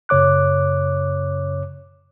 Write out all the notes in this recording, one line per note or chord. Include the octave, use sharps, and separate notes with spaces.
F#2 C#3 C#5 D6 F#6